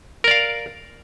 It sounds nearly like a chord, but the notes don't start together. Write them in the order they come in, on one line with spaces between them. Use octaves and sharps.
A#4 D5 F5